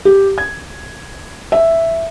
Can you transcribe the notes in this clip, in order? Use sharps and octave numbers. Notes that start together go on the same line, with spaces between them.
G4
G#6
E5